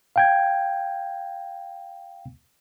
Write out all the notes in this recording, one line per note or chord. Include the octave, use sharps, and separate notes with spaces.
F5 G5 G#6